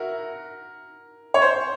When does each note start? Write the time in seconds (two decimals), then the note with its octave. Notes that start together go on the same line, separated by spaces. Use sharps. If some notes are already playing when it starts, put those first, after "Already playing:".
Already playing: E4 F#4 A#4
1.34 C#5
1.42 C5